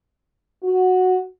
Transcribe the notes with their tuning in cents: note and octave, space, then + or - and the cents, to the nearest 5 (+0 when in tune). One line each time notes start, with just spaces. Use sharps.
F#4 -5